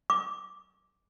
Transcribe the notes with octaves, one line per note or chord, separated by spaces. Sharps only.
D6